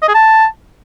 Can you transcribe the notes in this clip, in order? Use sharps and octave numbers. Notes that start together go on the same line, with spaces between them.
D#5
G#4
A5